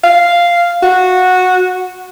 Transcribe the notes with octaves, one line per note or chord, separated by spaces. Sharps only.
F5
F#4